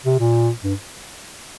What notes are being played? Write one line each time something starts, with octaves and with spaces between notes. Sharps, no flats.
C3
A#2
G2